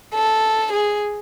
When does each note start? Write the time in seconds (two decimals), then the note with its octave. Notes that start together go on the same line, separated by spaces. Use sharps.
0.14 A4
0.73 G#4